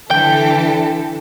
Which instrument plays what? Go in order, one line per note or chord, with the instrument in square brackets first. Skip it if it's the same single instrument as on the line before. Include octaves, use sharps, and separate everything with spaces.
[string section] D3 E3 A4 [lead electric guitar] G5